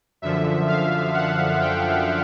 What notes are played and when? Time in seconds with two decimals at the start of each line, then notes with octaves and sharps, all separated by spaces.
0.22 F#2 D3 F3 E5
0.68 F5
1.14 F#5
1.61 G5